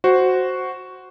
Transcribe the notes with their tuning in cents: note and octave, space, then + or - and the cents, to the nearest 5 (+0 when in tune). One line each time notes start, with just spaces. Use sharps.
F#4 +0 C5 +0